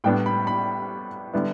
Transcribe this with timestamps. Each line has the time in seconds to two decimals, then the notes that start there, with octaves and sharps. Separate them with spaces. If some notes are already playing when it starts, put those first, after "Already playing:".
0.04 A2 G3 B3 D4 G5
0.26 B5
0.47 B5
1.33 D3 G3 B3 E4